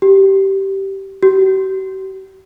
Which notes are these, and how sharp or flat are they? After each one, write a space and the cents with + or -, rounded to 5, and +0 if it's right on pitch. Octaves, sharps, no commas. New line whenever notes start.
G4 -15
G4 -45